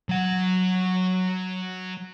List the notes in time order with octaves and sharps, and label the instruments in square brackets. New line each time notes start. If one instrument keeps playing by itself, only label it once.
[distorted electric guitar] F#3 F#5